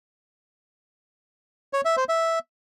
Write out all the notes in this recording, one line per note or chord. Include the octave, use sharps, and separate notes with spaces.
C#5
E5
C5
E5